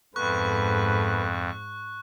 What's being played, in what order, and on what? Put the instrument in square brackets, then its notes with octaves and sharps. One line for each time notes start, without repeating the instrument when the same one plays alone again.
[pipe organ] F2 [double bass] G#2 [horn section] B3 A4 B4 [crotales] C#6 F#6